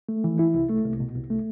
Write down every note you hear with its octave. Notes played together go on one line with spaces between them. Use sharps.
A3
E3
E4
C2
A3
C2
B2
C2
A3